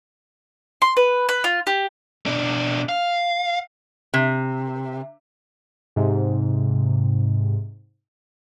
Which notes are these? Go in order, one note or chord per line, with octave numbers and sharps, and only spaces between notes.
C6
B4
B4
F4
G4
B2 D4
F5
C3
G#2 C3